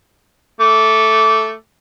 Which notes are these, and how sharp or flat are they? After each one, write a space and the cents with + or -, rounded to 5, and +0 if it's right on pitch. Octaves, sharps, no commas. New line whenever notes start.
A3 +0 D6 -20